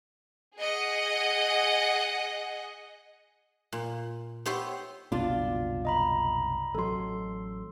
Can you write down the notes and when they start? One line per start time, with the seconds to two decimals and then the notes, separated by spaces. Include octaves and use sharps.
0.57 G#4 D#5 F#5
3.72 A#2
4.46 B3 G4 C5 C#5 E5 C6
5.12 F#1 C2 B2 D4 F4
5.85 D#5 A#5 B5
6.75 A1 F#3 A4 C6